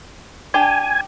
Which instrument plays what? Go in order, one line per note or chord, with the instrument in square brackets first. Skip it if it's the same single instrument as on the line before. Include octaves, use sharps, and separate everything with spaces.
[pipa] D4 G4 [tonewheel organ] G#5